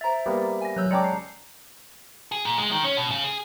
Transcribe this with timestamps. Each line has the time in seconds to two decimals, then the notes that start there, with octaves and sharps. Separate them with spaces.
0.01 C5 E5 A#5 A6
0.26 G3 A#3 B3
0.61 G#5 A#6
0.76 F#3 C#5 E6 F#6 G6
0.91 G#3 C#4 D5 G5 A5 A#5 D6 C#7
1.04 C7
2.32 G#4
2.45 A#2
2.58 G#3
2.72 D#3
2.84 C#4
2.97 B2
3.11 C#3
3.24 G#4